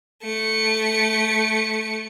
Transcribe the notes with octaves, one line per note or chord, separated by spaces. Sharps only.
A3 C#7